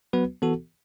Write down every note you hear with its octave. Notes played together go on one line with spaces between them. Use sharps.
F#3 B3 F#4 B4
E3 B3 F#4 A4